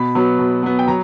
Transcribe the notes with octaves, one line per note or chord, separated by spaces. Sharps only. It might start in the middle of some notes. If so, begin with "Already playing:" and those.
Already playing: B2 B5
F#3 B3
B2
F#3 B3
G5
F#3 A#5